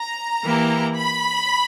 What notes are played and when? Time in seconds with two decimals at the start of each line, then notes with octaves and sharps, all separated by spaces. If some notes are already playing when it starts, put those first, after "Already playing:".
Already playing: A#5
0.43 E3 A#3 E4 G4
0.97 B5